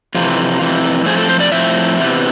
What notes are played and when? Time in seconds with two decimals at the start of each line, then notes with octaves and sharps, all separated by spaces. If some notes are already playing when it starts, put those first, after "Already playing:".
0.15 F2 C3 E3 F4
0.61 F2 C3 E3
1.06 A2 F3 A3 C4 G#4
1.18 A4
1.29 C5
1.40 D5
1.52 A2 F3 A3 C4 E5
1.98 C3 E3 B3